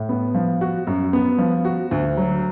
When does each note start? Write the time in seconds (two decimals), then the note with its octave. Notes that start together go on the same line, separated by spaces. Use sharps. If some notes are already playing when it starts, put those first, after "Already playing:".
Already playing: A2
0.09 B3
0.34 F3
0.61 F#4
0.87 F#2
1.13 B3
1.38 F3
1.65 F#4
1.91 D2
2.17 F#3